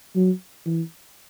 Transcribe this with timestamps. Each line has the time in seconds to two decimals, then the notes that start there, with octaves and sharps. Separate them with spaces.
0.16 F#3
0.66 E3